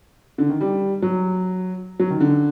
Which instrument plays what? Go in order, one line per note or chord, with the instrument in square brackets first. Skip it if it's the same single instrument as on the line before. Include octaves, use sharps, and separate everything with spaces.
[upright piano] D3
D#3
G3
F#3
F#3
D#3
D3